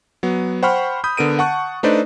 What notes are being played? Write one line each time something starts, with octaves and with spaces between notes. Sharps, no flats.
F#3 B3
C5 F#5 G5 B5 C#6 F6
B5 D#6 G6
D3 B3 A#4 D7 D#7
F#5 A5 C#6 F#6
A3 D4 D#4 B4 C5 D5